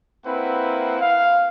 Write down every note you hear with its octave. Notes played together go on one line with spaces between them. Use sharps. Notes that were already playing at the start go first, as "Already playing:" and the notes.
A#3 C4 E4 B4 F#5
F5